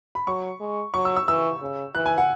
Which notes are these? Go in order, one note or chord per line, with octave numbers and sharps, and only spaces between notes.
B5
F#3 C#6
G#3
F#3 C#6
E6
E6
E3 E6
C#3
E3 F#6
G#5
F#5